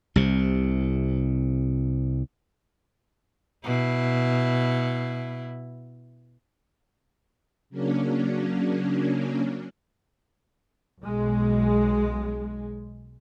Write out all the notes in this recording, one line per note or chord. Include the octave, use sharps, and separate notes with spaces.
C2 C3
B2 E4
C#3 F#3 A#3 C#4 D4
B1 G#3